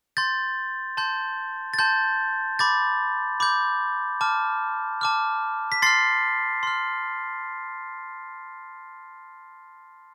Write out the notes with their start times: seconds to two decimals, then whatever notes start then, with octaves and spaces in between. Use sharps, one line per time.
0.17 C6 G6 A6
0.97 A5 C6 G6
1.74 A6
1.79 A5 C6 G6
2.59 B5 D6 G6 A6
3.40 B5 D6 G6
4.21 A5 D6 F6
5.01 A5 D6 F6
5.72 B6
5.82 C6 F6 A6 C7
6.63 C6 F6